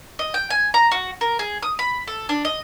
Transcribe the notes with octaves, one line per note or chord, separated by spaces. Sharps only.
D#5
G5
G#5
A#5
F#4
A#4
G#4
D#6
B5
A4
D4
D#5